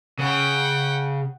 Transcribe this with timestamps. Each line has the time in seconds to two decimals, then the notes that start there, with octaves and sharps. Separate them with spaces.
0.20 C#3 F#5 G5